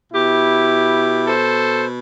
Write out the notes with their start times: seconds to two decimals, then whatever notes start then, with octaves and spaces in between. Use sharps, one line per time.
0.13 B2 E4 G4
1.26 A4 C5